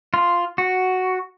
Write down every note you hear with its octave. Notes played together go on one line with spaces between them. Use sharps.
F4
F#4